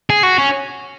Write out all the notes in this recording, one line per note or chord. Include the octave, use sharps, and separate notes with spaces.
G#4
F#4
C#4